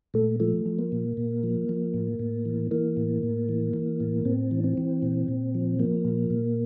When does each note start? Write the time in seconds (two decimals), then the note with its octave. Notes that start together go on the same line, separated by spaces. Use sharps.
0.14 A#2 A3
0.40 F3 A3
0.66 F3
0.79 A#3
0.92 A#2
1.17 A#2
1.43 F3
1.69 F3
1.94 A2
2.19 A2
2.45 E3
2.71 E3 A#3
2.97 A2
3.23 A2
3.49 E3
3.73 E3
4.00 A2
4.25 A2 C4
4.51 E3
4.64 C4
4.77 E3
5.02 A#2
5.28 A#2
5.55 F3
5.79 F3 A#3
6.05 A#2
6.30 A#2